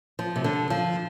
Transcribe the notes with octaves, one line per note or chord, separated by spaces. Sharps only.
F3
C3
D3
F3